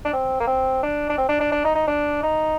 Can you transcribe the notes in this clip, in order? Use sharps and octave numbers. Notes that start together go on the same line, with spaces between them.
D4
C4
A#3
C4
D4
D4
C4
D4
D4
D4
D#4
D#4
D4
D#4